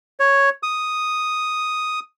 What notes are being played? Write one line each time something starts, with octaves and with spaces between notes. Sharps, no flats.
C#5
D#6